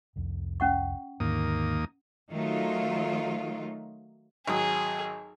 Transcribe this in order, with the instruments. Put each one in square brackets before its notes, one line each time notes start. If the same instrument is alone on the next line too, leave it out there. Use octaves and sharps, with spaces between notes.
[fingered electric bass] C2 F2
[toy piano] C#4 F#5 C#6
[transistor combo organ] D#2 A#3 D#6 [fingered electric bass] G#2 D3
[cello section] D#3 F#3 A3 D#4 F4
[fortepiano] G#1 F#3 D#6 [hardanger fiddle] G#4